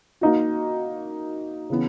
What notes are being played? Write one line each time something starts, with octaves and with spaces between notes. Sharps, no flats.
A#3 D#4 F#4
C#3 E3 B3